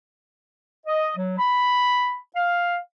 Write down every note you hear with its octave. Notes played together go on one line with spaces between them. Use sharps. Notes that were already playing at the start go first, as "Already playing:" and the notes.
D#5
F#3
B5
F5